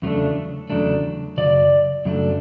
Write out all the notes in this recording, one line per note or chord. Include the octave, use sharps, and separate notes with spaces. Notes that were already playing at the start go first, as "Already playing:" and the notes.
E2 C#3 F#3 A3 D4
E2 C#3 F#3 A3 D4
F#2 C#3 F#3 D5
F#2 C#3 F#3 A3 D4